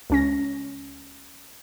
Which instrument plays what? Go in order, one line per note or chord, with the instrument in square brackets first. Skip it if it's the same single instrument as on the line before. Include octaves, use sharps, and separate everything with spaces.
[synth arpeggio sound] C#2 C#4 A#6